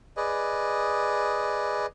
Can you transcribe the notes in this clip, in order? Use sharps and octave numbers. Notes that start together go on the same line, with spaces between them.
G#4 B4 D5 D#5